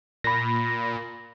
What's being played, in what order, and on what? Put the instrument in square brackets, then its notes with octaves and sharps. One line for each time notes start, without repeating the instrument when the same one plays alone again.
[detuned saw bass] A#2 [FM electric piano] B5 A#6